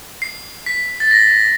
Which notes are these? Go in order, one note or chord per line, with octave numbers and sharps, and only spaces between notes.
C7
B6
A6
A#6